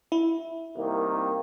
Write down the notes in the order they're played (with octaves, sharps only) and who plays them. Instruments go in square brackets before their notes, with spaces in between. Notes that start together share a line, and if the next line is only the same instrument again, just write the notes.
[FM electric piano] E4
[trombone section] C2 D#3 A#3